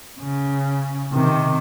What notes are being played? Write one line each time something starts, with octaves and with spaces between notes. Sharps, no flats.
C#3
C3 D#3